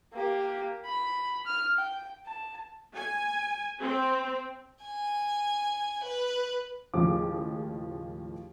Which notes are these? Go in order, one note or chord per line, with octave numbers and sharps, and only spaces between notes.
A#3 G4
B5
F6
G5
A5
G#5
C4
G#5
B4
D#2 A2 C#3 F3 G#3 D6